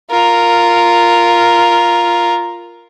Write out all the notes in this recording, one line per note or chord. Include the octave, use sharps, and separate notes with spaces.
F4 A#4